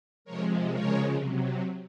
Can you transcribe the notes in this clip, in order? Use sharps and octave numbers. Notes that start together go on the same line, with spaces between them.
C3 F3 G#3 A#4 C#5
C#3 F3 G#3 A#4 C#5
C3 F#3